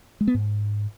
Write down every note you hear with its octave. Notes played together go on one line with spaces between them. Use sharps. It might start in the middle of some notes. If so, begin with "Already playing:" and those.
G#3
B3
G#2